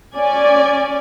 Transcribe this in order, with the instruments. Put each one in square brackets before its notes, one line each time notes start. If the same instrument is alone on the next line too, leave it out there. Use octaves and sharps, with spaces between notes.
[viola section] C#4 D5 G#5